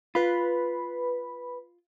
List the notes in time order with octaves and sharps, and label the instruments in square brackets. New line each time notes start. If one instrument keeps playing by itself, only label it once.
[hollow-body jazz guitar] F4 [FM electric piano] B4 B5